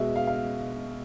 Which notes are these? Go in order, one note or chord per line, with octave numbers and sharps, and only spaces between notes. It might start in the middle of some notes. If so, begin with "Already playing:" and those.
Already playing: B2 G#3 E5
F5
F5